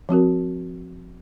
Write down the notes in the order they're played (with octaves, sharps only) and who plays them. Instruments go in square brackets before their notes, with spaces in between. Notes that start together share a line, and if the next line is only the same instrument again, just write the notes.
[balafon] F3 C4 F#4 A#4